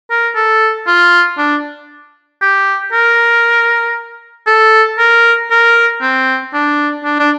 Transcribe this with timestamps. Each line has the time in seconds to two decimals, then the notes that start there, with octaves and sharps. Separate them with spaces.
0.11 A#4
0.36 A4
0.87 F4
1.38 D4
2.42 G4
2.93 A#4
4.47 A4
4.99 A#4
5.51 A#4
6.02 C4
6.54 D4
7.04 D4
7.20 D4